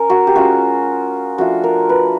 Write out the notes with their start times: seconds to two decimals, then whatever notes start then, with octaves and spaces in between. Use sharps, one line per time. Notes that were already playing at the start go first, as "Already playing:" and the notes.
Already playing: C#4 A#4
0.10 F#4
0.27 G4
0.35 G#3 C#4 F4 F#4
1.38 F3 A3 D4 F4 F#4
1.64 A#4
1.89 B4